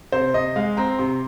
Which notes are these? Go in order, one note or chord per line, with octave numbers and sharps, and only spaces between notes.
C3 C5
C3 D#5
G#3 F5
C4 A#5
C3 C6